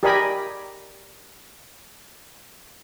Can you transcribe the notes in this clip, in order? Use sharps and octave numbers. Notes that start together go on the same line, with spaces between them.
G4 A#4 D5 D#5 G#5 B5